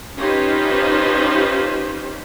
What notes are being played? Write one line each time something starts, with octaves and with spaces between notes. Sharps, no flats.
C#4 D#4 F4 G4 B4 C5